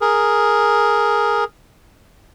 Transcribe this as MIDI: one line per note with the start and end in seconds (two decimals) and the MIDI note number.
0.01 1.44 68
0.01 1.44 70